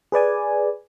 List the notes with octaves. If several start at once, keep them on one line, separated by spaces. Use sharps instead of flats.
G#4 B4 D5 G#5